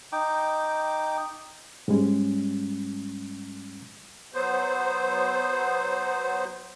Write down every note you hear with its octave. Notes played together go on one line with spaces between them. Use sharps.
D#4 G5 D6
G#2 G3 G#3 C#4
F#3 B3 C5